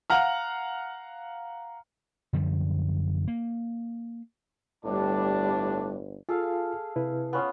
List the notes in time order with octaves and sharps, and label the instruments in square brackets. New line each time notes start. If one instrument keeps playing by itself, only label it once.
[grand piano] F5 F#5 A#5 F6
[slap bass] F#2 D3 F3 G3
A#3
[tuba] G1 [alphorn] A2 [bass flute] G3 [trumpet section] D4
[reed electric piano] F4 [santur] G#4 A4 F5
[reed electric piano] C3 E4 B4
[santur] B3 C#4 F4